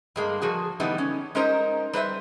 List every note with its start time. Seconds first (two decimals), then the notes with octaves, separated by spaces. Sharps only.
0.16 G2 G#3 A#3
0.41 F3 F#4 G#4
0.80 D3 E3 G3 B3 D#4
0.98 C#4
1.35 G#3 C#4 D#4 A#4 C5
1.93 G3 B4 C5 E5